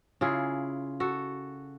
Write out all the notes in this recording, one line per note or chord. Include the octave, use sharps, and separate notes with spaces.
C#3 E4 F4 G#4
F#4 A4